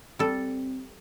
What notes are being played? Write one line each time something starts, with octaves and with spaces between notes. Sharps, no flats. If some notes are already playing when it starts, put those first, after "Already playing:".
G3 C4 A4